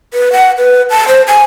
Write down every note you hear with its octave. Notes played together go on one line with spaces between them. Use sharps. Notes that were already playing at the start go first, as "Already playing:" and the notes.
B4
F#5
B4
A5
C5
G#5